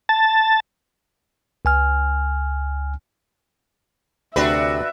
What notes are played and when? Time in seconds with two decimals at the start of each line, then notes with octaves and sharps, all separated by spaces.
0.09 A5
1.65 C#2 G#5 F6
4.36 D2 C3 D4 F#4 B4 E5